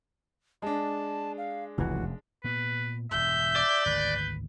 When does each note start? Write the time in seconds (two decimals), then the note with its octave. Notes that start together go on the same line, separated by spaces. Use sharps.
0.62 G#3 D4 A5
1.38 F5
1.78 F1 C#2 F#2 E3 F#4
2.44 A#2 B3 B4
3.11 E1 G2 E5 G6
3.56 D5
3.86 G#1 D2 B4